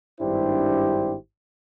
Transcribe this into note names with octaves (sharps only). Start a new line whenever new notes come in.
G#1 G2 D4 E4 G4 C5